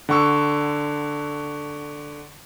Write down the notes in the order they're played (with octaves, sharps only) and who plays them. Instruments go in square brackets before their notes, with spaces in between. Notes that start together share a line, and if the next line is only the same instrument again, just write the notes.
[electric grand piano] D3 F#5 C#6 E6